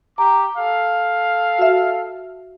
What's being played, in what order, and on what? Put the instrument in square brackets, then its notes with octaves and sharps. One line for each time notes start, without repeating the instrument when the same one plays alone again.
[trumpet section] G4 D6 [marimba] A#5
[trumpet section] A4 F5
[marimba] F#4 E5